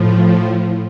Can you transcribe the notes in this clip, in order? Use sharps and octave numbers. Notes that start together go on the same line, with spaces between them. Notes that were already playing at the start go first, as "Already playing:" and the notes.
Already playing: A2 F3